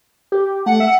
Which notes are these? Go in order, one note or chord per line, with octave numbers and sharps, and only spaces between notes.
G4
A3 F#5
E5